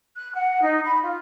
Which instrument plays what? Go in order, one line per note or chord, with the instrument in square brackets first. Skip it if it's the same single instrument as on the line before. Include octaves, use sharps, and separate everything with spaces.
[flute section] F#6
F#5
D#4
B5
F4